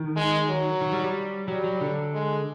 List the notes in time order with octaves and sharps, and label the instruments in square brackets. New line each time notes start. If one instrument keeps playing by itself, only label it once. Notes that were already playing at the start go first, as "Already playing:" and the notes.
Already playing: [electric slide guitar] D#3
[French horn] G#3
F#3
[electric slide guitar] D#3
G3
G3
[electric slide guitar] F#3 [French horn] G3
[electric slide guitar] F#3
D3
[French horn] G#3